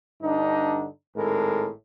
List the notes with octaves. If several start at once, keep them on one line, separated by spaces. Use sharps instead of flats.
G2 D3 D4 D#4
G#1 A2 G#3 A4 A#4